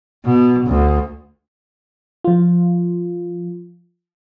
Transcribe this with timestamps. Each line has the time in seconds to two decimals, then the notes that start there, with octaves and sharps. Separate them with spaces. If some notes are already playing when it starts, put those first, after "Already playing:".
0.25 B2
0.67 D2
2.24 F3 F4